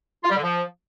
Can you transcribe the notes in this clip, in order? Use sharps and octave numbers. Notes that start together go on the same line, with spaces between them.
F4
G3
D3
F3